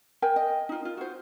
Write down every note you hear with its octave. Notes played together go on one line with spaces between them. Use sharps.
A#4 G5 G#5
D#5
D#4 F4
F4
F#4 C5